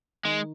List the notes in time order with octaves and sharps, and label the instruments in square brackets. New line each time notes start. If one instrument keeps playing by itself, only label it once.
[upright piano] D#3 [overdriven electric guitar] G#3